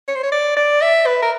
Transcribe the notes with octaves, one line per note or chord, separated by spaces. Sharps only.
C#5
C5
C#5
D5
D5
E5
B4
A#4